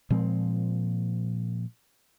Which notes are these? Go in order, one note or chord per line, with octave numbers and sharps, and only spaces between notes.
A#2 F3 G#3 C4